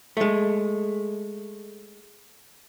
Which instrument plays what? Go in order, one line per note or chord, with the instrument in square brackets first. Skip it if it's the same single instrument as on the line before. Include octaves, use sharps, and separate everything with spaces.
[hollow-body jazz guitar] G#3 A3